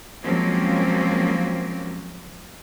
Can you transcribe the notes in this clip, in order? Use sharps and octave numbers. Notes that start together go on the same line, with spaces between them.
F3 F#3 G#3 A#3 C4 C#4